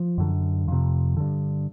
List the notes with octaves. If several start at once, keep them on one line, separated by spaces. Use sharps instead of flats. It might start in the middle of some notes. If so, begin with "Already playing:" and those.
Already playing: F3
F#2 D3
F2 C3
G2 D3